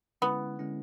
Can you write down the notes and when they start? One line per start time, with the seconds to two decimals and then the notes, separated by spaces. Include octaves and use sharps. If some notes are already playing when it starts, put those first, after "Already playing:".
0.22 D3 G#3 B3 C#4 E4
0.59 D3 G#3 C#4 E4